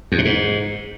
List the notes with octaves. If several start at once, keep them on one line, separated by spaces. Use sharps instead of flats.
E2
B2
G#2